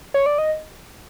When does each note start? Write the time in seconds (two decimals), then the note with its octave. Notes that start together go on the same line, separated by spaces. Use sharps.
0.14 C#5
0.26 D5
0.38 D#5